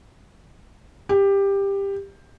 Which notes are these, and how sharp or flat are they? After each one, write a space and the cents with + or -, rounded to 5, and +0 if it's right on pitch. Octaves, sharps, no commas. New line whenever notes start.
G4 +15